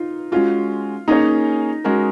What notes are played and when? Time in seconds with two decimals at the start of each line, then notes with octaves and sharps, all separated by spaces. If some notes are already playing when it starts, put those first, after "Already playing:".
Already playing: D#4 F4
0.32 G#3 C#4 F4 F#4
1.08 A#3 C#4 D#4 G#4 C#5
1.84 G#3 C#4 F#4 A#4